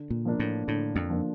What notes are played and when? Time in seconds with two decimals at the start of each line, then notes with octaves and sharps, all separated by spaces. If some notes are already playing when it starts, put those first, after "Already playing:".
Already playing: D3
0.10 A#2
0.25 F3 A#3 D4
0.40 A2
0.67 A2 D3
0.96 F2
1.10 F3 A#3 D4